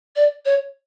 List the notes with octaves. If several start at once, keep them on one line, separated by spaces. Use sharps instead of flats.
D5
C#5